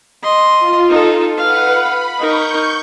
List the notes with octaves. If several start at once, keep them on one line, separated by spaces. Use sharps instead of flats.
D#5 C6
F4
D#4 A4
B4 F5 F#5
B5
D#4 A#4 C#6 G6